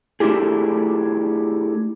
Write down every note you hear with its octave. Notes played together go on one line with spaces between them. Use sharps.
A3 D4 E4 F4 G4 G#4